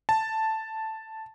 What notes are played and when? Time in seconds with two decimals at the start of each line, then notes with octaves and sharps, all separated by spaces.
0.09 A5